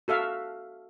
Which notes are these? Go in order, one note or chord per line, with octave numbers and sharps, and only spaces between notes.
F#4 A4 E5 F5